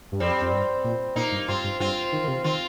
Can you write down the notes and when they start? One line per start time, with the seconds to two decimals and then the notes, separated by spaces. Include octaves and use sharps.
0.12 G2
0.20 F2 G3 C4
0.42 F2
0.52 G2
0.84 A#2
1.15 A#2 A#3 D#4
1.32 G2
1.48 G2 C4 F4
1.64 G2
1.80 G2 C4 F4
2.13 D#3
2.24 D#3
2.28 C3
2.44 D#3 C4 F4